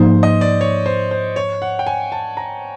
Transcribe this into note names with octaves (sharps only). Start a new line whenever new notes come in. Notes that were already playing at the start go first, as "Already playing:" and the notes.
Already playing: G#2 F3 A#3 D#4 C5
D#5
D5
C#5
C5
C5
C#5
F#5
G5
G#5
A5
A#5